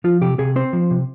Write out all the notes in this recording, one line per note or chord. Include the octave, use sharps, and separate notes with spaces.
F3 F4
C3 G4
C3 G#4
C4 C5
F3
C3